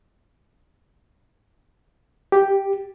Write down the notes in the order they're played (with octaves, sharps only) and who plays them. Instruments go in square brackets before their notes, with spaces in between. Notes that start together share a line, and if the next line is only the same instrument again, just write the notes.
[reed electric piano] G4